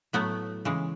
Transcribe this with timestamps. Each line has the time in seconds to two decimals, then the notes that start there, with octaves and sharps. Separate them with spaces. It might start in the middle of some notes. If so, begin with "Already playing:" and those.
0.13 A2 F#3 A3 B3
0.65 C#3 E3 G#3